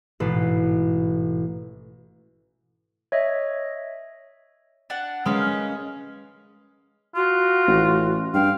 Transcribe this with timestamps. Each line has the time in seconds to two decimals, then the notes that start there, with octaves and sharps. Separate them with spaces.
0.20 A1 G#2 B2 A4 B4 C7
3.12 C#5 D#5 E5
4.90 D4 F#5
5.26 G#3 C#4 A#4 B4 F5
7.16 F4 F#4
7.68 A1
8.34 G2 F5 G5